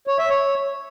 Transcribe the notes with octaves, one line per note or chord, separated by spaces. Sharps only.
C#5
E5
C#5